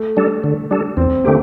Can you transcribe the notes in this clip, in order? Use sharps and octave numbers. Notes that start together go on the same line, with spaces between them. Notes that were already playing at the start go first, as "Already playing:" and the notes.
Already playing: A3
G3 D4 A4
D3
G3 D4 A4
E2 C4
D3 A3 A#3 C4 G4